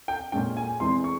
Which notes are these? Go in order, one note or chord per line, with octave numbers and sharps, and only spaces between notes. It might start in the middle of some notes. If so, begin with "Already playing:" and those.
G5
A#2 G#3 C#4 G5
G#5
E2 E3 G#3 C4 C6
C#6